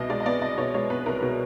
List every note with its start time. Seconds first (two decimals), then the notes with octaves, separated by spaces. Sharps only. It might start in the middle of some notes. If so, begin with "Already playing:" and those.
Already playing: C2 B2 D#5
0.09 G#3 D5
0.20 D#5
0.26 B3 D5
0.41 C2 D#5
0.58 B2 C#5
0.74 G#3 C#5
0.90 B3 B4
1.06 C2 A#4
1.22 B2